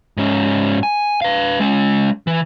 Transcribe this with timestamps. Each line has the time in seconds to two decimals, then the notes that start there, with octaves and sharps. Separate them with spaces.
0.17 G#2 C#4
0.83 G#5
1.22 B4 F5
1.60 G#3 C#4
2.27 E3